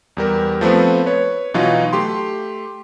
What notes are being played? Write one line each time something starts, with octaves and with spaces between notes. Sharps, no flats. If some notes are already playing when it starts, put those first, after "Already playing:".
E2 G3 A#4
F3 A3 B3 C4
B4 C#5
B2 E3 F#3 D#4 F4
A3 G4 C6